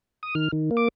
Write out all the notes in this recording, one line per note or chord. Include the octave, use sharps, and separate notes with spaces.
D#6
D#3 F6
D#3
A#3
D6